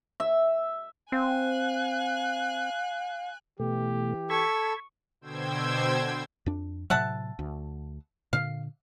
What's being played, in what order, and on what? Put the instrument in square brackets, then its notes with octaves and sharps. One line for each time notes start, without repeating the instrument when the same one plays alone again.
[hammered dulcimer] E5
[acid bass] C4 [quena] F5 [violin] G#5 F#6
[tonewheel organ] B2 A3 [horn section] E3 G4
[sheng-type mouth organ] A4 E6 [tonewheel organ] B5 G#6 [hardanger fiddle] C#6
[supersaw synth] B2 D3 C5 G5 E6 G#6
[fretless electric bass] F2 D4
[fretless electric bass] A2 C3 F#3 [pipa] E5 F#5 A5
[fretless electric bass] D2
[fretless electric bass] A#2 D3 [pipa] F5